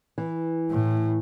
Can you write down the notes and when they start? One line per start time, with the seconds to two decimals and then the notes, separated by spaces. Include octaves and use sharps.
0.18 E3
0.71 A2